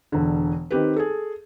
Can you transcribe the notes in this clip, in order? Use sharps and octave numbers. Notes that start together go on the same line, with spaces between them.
E1 D3
D#3 C4 G4 B4
G#4 A4